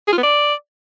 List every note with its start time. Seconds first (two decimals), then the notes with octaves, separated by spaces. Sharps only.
0.08 G#4
0.13 F4
0.18 B3
0.23 D5